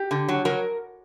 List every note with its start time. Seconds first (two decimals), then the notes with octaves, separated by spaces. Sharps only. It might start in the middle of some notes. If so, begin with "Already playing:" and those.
Already playing: G4
0.11 D3
0.29 F#3
0.45 F#3 A#4